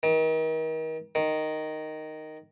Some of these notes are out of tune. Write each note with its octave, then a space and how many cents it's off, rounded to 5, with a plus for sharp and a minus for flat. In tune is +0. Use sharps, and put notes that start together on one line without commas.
D#3 +35
D#3 -5